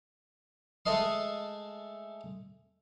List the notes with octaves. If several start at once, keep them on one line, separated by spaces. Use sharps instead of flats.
G#3 A3 A4 D#5 C6